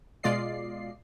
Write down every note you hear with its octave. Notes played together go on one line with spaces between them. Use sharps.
B2 G#3 F4 D5 D#5 C7